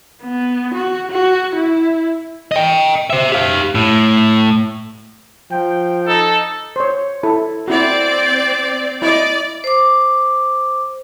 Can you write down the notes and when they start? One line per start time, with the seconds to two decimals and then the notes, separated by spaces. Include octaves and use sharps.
0.22 B3
0.74 F#4
1.11 F#4
1.55 E4
2.51 D#5 G5
3.10 C5 E5
3.32 G4 F5
3.75 A2
5.51 F3 G5
6.08 D#4 A4
6.76 C5 C#5
7.23 E4 A4
7.68 C4 E4 F#4 D5
9.02 E4 D5 D#5
9.64 C5 D6